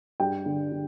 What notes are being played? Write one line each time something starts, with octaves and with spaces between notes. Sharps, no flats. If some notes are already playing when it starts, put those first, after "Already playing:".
G2 G5
D3
D3